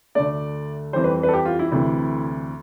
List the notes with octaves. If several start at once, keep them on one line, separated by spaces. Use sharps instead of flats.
D2 D3 A3 D5
F2 E3 G3 C5
B4
B4
A4
G4
F4
E4
D2 C3 E3 A3